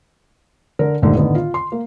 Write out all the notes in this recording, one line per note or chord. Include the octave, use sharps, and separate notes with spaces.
D3 A#4
A#1 D#2 G#2 D3 D#3 A3
A2 D3 D#3 B3
F4
C6
A#3